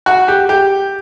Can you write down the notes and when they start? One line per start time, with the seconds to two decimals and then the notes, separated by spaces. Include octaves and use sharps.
0.06 F#4
0.28 G4
0.49 G4